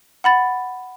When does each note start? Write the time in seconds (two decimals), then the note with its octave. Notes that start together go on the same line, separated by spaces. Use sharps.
0.24 F#5 B5 A6